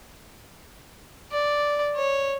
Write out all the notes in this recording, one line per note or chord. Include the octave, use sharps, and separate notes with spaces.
D5
C#5